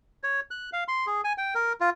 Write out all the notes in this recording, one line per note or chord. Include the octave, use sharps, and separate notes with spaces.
C#5
F#6
F5
C6
G#4
G#5
G5
A#4
F4